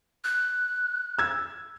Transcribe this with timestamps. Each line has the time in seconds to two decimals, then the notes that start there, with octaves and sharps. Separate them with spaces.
0.24 F#6
1.18 E6 G#6